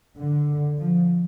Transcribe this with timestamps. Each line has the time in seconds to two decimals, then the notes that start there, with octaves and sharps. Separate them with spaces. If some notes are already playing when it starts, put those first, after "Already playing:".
0.17 D3
0.78 F3